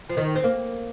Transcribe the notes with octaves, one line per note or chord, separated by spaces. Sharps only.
F3
D#3
C4
A#3